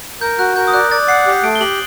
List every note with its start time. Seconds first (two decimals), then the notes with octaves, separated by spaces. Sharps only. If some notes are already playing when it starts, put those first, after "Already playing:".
0.21 A#4 G6
0.39 F#4 F#6
0.56 A#4 G6
0.67 D#6
0.74 D5 F#6
0.91 D5 A6
1.08 F#5 C7
1.27 G4
1.43 A3 D7
1.55 G7
1.60 G4 F#7